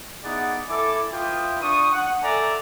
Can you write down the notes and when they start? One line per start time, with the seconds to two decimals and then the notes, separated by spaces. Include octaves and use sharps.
0.24 B3 D#4 E4 G#4 D5 F#5
0.69 E4 A4 G#5 D6
1.13 F4 B4 E5 F5 G5 D#6
1.62 D4 C#6 D#6
1.92 F#5
2.22 A4 D5 E5 G5 G#5 A#5